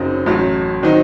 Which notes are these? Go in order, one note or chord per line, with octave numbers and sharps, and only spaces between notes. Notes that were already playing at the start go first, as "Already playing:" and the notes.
Already playing: F#1 F#2 F#3 C4 D#4
A1 A2 F#3
D#3 F#3 C4 D#4